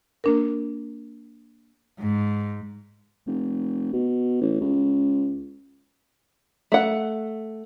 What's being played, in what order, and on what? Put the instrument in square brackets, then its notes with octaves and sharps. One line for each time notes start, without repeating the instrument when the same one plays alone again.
[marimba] A#3 D4 A#4
[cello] G#2
[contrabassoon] F1
B2
A1
C#2
[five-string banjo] A3 F#5